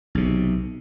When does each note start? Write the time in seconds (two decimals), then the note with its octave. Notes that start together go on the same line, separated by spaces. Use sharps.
0.15 B1 C3